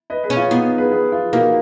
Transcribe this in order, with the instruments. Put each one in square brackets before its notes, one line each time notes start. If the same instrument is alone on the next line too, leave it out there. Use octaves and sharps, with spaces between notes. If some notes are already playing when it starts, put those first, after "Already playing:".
[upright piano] B4 D#5
G#4 B4
[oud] C#4
[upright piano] F4
[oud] B3 [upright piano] D#4
[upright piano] G#4 B4
G#4 B4
F4 G#4
[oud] A#3 [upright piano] D#4 F#4